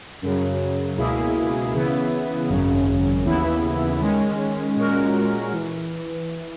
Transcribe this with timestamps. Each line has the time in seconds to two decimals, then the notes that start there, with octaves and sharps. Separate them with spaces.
0.22 F#2 C#3 F#3
0.98 C#2 B2 A#3 E4 G#4
1.74 C#3 E3 B3 E4
2.49 G#1 F#2 C#3 F#3 C#4
3.25 D#2 C#3 E3 B3 E4
4.00 D#3 G#3 C#4
4.76 A#2 G#3 C#4 F#4 A#4
5.53 E3